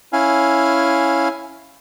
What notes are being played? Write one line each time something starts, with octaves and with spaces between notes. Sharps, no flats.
C#4 E4 F5 G#5